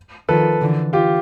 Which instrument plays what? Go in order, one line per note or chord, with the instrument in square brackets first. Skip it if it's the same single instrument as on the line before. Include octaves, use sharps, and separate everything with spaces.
[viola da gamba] D#3 F3 [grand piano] A4 B4
[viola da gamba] D3 E3
[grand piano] F4 G4